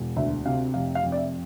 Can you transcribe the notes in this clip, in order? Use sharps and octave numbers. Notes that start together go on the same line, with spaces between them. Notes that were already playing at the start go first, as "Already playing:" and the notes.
Already playing: E1
D2 E5
C3 F5
F1 F5
F5
F2
D5
E5